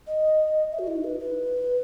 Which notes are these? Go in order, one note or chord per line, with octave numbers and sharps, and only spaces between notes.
D#5
E5
F#4
E4
D#4
B4
B4